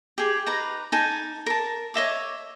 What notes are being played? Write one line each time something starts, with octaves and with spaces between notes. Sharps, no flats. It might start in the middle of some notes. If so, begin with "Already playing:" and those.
G4 G#4
D#4 B4 A#5
D#4 G#5 A5
A#4 A5
C#5 D#5 E5 D6